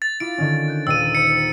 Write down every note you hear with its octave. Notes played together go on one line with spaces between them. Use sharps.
A6
E4 F4 D6 D7
D3 D#3 C#4
F#6 G6
D#1 G5 A#5 E6 D#7
C5 A#5 C#7